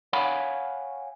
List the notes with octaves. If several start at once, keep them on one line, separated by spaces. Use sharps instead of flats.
C#5 F5 F#5 G#5 B5